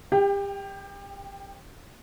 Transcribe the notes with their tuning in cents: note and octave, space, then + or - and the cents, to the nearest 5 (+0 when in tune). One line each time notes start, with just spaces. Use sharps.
G4 +30 G5 +0